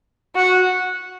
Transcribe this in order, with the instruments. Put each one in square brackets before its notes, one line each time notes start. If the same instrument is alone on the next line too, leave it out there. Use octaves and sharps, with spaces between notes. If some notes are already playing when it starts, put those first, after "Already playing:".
[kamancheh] F#4